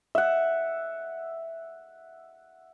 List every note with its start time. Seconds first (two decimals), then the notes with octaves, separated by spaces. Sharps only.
0.15 E5 F#5